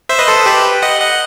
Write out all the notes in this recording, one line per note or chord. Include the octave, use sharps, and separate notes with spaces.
C5 E5
B4 D#5
A4 C5
G4 B4
D#5 F#5
D#5 F#5